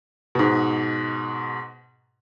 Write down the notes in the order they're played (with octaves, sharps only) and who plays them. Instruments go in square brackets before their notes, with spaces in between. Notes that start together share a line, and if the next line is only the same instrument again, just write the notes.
[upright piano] G#2 B2